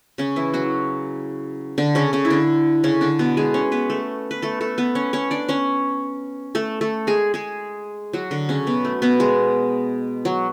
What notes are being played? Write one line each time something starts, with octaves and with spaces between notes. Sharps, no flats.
C#3 C#4
E3 E4
F#3 F#4
D3 D4
C#3 C#4
C#3 C#4
E4
D3 D4
C#3 C#4
D3 D4
B2 B3
G#3 G#4
C#4 C#5
B3 B4
A3 A4
B4
A3 A4
A3 A4
B3 B4
C#4 C#5
C#4 C#5
D4 D5
C#4 C#5
A3 A4
A3 A4
G#3 G#4
G#3 G#4
F#3 F#4
D3 D4
C#3 C#4
B2 B3
A3
B2 B3
G#3
F#3